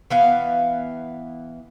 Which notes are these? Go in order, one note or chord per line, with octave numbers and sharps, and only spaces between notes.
E3 B3 F5